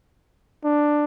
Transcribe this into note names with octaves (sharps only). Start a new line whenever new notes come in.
D4